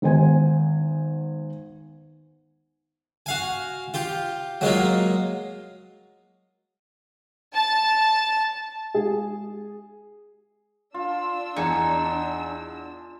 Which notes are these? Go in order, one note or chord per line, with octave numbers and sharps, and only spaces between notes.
G#1 B3 C5 G#5
F#4 F5 G#5
F4 G4
F#3 G#3 A#3 F4
A5
G#3 G#4
D4 F4 E6
E2 D#4 G#4 G#5 C#7